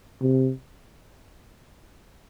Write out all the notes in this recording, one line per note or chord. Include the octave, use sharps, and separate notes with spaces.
C3